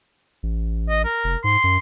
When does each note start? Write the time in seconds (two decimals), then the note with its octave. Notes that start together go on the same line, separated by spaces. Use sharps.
0.43 A1
0.89 D#5
1.05 A#4
1.24 F1
1.44 G#2 C6
1.64 F#2